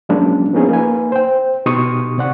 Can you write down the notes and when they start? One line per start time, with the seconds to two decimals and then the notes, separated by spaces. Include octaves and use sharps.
0.09 F3 F#3 G#3 A#3 C#4 D4
0.53 F3 A#3 B3 C#4 D#4 G#4
0.69 A#3 D#4 B4 G#5
1.12 C5 G5
1.66 B2 D#4 G4 C6 C#6 D#6
2.18 C3 D5 F#5 C#6